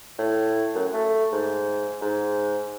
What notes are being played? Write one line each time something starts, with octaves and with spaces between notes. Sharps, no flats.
A2
F#2
A3
G#2
G#2